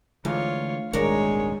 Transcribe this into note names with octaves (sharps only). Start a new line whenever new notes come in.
D2 D3 E3 G#3 F4 C#5
D#1 G#1 D#3 G#3 D4 A#4 C#5